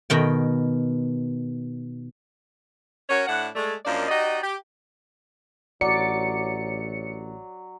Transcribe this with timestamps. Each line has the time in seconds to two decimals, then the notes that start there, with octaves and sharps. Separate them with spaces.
0.10 B2 D#3 G5
3.10 C#4 F#4 A#4 C#5
3.27 A2 D4 E4 F#5
3.56 G#3 A3 D5
3.85 F#2 F3 A#3 D4 D5 D#5
4.09 D#4 F#4 G4 D5 D#5
4.42 G4
5.81 A1 F#3 D5 C#7